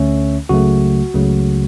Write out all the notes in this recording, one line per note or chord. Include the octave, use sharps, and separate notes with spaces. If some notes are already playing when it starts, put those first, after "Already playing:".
Already playing: D2 D3 A3 C#4 C#5 E5
C#2 C#3 F#3 A3 F#4
C#2 C#3 F#3 A3